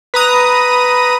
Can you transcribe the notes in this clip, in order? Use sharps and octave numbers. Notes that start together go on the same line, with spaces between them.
B4 A#5 D#6